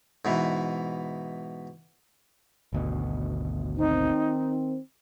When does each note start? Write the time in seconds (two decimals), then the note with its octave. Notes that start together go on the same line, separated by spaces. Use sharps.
0.25 G#2 B2 E3
2.73 G#1 D2 B2
3.77 D#3 C4 D#4